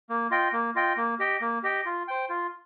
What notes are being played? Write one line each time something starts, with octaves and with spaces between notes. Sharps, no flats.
A#3
F4 D#5 G5
A#3
F4 D#5 G5
A#3
G4 D#5 G5
A#3
G4 D#5 G5
F4
C5 G5
F4